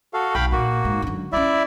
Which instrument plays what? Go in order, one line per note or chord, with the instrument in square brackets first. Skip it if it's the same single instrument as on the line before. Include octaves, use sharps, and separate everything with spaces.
[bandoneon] F#4 A4 F5
[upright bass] B1 [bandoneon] F5 G5 B5
[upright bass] A#2 [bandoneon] A#3 F#4
[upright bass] G#2
F#2 D3
[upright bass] G#3 C#4 [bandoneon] E4 D5 E5